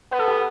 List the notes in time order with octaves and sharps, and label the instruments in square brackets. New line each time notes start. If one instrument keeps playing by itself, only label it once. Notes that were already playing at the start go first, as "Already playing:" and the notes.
[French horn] B3 [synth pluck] B4
[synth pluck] A4
G4